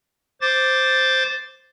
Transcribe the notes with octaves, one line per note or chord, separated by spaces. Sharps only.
C5 D6 A6